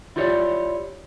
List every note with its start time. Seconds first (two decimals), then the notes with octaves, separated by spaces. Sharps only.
0.16 E4 F4 G4 A#4 C#5 D5